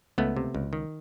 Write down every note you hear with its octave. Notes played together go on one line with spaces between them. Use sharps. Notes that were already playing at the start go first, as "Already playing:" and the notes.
C#2 A3 B3
C3
C#2
D#3